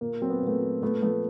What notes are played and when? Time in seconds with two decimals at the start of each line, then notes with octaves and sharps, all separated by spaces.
0.01 A#2 A#3
0.22 F#3 C4
0.30 B3
0.38 A#2 A#3
0.47 A3 B3
0.62 F#3
0.82 A#2 A3 B3
1.02 F3 A3 B3